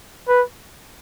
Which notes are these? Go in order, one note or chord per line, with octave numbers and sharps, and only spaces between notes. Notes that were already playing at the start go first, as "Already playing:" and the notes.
B4